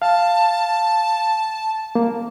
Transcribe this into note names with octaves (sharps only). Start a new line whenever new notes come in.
F5 A5
A#3